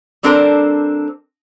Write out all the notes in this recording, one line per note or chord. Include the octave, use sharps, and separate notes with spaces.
G3 C4 D4 A4 A#4 C5